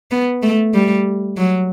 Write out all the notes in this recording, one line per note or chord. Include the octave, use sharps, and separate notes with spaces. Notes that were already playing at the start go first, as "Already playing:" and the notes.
B3
A3
G3
F#3